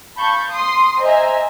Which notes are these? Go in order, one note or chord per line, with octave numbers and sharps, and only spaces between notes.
F5 A5 B5 C#6 G6
C6 D#6
C5 D#5 E5 G#5 A#5